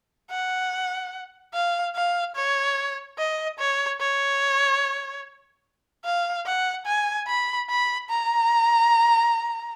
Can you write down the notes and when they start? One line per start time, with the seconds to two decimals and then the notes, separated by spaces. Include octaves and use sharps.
0.31 F#5
1.53 F5
1.95 F5
2.36 C#5
3.18 D#5
3.59 C#5
4.00 C#5
6.04 F5
6.46 F#5
6.86 G#5
7.27 B5
7.69 B5
8.09 A#5